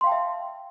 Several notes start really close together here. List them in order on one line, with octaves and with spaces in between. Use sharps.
C6 F5 G5 A5 E5